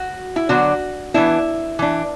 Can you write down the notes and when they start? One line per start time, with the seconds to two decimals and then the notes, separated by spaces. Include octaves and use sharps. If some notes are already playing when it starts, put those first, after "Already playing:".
Already playing: F#4
0.36 E4
0.49 D3 F#3 B3 D4 F#4
1.14 E3 B3 D4 E4
1.79 E3 D4